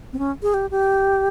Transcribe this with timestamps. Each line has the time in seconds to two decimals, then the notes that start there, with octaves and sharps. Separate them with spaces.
0.13 C4
0.19 C#4
0.42 G#4
0.54 G4
0.71 G4